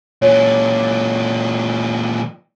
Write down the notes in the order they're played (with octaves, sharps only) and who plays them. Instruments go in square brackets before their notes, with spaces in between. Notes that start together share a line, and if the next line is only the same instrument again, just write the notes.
[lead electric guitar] A#2 E3 [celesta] C#5